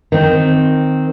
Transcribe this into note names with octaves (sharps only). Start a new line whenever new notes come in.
D#3 C4